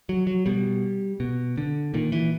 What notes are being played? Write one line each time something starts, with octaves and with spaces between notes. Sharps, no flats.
F#3
F#3
B2 G3
B2
D3
A#2 D#3
E3